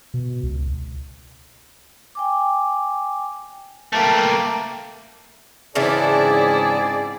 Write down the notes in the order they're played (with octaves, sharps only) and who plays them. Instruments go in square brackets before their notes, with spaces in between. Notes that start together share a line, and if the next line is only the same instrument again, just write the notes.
[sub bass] B2
C#2
[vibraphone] G5 G#5 D6
[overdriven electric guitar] A3 A#3 [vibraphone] E5 G5
[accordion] G#2 D5 [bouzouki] C#3 E3 D4 [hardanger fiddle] C4 E4 [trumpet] G#4